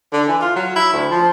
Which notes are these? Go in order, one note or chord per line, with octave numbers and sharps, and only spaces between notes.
D3
E3
F4
F#3
E4
D2
F3